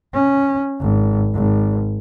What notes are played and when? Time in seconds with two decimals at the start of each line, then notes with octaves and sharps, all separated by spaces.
0.14 C#4
0.80 G#1
1.34 G#1